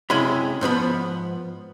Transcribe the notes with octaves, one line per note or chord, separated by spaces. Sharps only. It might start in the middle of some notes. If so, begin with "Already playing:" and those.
F#2 C3 G#3 C#4 E4 B5
G#2 F3 B3 B5